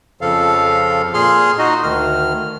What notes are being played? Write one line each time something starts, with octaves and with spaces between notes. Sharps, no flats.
F2 C#3 F3 A4 F5
A#2 G#4 C6 F6
D#4 F#4 D#5
D2 D#3 F6